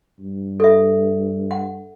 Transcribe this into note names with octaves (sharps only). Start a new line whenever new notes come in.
G2
A4 E5
F#5